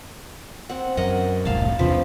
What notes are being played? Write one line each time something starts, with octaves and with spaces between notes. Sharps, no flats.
C4 F#5
F#2 A#4 D#5 F#5
E1 C2 A2 F5 A5
E2 C3 F3 D4 B4